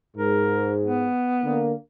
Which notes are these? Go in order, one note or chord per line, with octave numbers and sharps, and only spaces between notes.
G#2 A#4
B3
D3 A#3